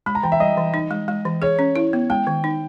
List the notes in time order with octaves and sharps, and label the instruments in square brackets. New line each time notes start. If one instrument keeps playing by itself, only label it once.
[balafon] G#3 [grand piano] B5
[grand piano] A#5
[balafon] E3 [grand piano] G5
[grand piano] E5
[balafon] G3 [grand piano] D#5
[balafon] E3
D#4
G#3
G#3
E3
[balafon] G#4 [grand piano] C#5
[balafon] C#4
E4
B3
[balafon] G#3 [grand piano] G5
[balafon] D#3
D#4